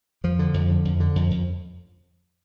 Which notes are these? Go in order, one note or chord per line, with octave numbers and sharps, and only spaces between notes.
F2 F3
D3
F2
D3
F2
D3
F2
F2